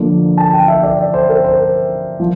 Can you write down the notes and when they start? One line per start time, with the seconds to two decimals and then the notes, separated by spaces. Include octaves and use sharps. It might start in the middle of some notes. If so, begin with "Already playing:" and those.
Already playing: D3 F3 A#3
0.38 A5
0.53 G5
0.68 E5
0.83 D5
0.98 D5
1.14 C5
1.29 A#4
1.44 C5
2.20 F3